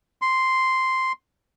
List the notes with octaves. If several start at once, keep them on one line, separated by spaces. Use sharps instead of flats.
C6